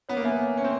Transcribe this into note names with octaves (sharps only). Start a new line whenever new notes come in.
B3 C#5
A#3
B3 E5 G#5
C#5
C#4 G#5
C4 E5